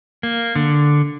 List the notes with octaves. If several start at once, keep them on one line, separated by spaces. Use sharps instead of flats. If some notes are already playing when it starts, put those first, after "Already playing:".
A#3
D3